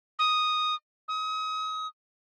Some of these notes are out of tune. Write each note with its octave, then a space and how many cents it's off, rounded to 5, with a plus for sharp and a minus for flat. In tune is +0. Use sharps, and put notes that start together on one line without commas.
D#6 -5
D#6 +35